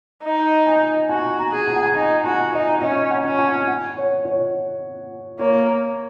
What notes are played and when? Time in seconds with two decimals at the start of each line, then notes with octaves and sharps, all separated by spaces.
0.24 D#4
0.66 G#5
1.09 F#4 G#5
1.39 A#5
1.52 G#4
1.67 G#5
1.76 F#5
1.86 G#5
1.95 D#4 A#5
2.24 F#4 G#5
2.53 D#4 D#5
2.82 C#4 D#5
3.11 F#5
3.25 C#4
3.39 G#5
3.68 F#5
3.97 C#5
4.25 C#5
5.39 A#3 C#5